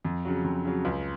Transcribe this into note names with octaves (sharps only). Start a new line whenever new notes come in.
F2
C#3 F#3
F2
C#3 F#3
C#2